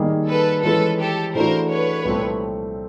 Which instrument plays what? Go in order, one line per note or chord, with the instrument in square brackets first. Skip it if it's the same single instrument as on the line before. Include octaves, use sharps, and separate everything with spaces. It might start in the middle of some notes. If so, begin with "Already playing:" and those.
Already playing: [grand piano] D#3 G3 A#3 D#4 G#4
[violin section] A4 B4
[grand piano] E3 G#3 C#4 F4 [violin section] A4 B4
[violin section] G4 A4
[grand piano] C#3 E3 A3 D4 F#4 [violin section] A#4 C5
[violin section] B4 C#5
[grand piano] C2 A#2 F3 A3 C4